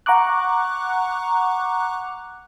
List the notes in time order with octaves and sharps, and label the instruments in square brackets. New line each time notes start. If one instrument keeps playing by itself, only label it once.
[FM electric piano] F#5 A#5 C#6 D6 F#6